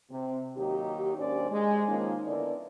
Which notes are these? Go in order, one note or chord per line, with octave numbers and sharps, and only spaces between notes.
C3
D#2 F#3 D#4 G4
D#2 G#2 C#4 D4 C5 D5
G#3
D#3 F3 A#3 C#4 D#4
D3 B3 E4 A#4 D5